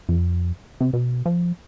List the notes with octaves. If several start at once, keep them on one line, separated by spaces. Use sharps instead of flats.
F2
C3
B2
F3